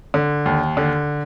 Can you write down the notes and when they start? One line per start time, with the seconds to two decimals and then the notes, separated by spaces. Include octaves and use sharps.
0.14 D3
0.46 D#2
0.77 D3